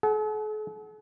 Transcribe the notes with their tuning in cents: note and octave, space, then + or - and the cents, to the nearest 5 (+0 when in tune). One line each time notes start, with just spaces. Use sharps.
A4 -45 F#5 +25